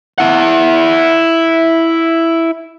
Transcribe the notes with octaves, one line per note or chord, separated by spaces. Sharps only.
E4 F#5